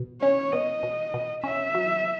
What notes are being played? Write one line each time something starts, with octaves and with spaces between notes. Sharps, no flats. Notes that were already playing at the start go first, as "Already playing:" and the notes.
Already playing: B2
C#4 C#5
B2 D#5
B2
B2
C#4 E5
F#3